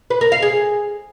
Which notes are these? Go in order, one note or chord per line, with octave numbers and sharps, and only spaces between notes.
B4
A#4
F5
G#4